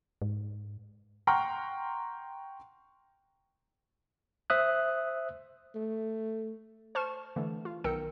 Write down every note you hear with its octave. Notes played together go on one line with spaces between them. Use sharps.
G#2
F#5 G5 A#5 C6 C#6 F6
C5 E5 D#6 F#6
A3
C5 A5 C#6 F6 E7
D3 E3 A3
F4
B1 D#3 A#4 G5 E6 C#7